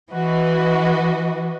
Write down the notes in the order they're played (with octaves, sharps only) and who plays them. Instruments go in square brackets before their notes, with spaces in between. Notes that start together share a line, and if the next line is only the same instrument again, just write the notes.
[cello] E3 [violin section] F#4 B4 D#5